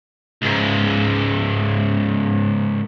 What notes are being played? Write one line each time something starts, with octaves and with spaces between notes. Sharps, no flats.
C#2 G#2